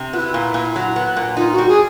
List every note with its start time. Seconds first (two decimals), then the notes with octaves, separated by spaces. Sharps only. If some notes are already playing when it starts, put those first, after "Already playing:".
Already playing: C3
0.13 B3 F4
0.18 E4
0.34 A#2
0.54 A#2
0.76 F#3
0.96 B3
1.17 A#2
1.37 D#4 F4
1.52 F#4
1.58 G3
1.68 G#4